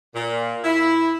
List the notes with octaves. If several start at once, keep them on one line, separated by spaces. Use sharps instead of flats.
A#2
E4